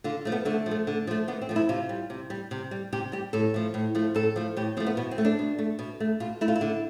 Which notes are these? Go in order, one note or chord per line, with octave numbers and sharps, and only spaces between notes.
D3 F4
F3 A3
B3
D3 A3
F3
A3
D3
F3 A3
D3 B3
C4
F3 A3
E4
C3 F4
G3
C3
G3
C3
G3
C3 G4
G3 G4
A2 A4
F3 A3
A2
F3 A3
A2 A4
F3 A3
A2 G4
F3 A3 C4
B3
B2 B3
C4
A3
D4
B2
A3
B2
A3
B2 F4
A3 E4
F4
E4
D3